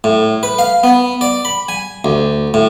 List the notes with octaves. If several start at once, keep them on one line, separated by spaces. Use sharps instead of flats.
A2
B4
F5
B3
D5
B5
G#5
D2
A2